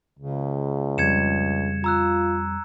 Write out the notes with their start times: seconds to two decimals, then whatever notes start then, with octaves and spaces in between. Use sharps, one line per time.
0.19 C#2 C#3
0.98 F2 G3 G#6 C#7 E7
1.84 F4 A#5 E6 F#6